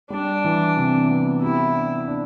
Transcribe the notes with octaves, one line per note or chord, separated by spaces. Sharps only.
G3 D4
E3
C3
B3
E4 G4
D4
D4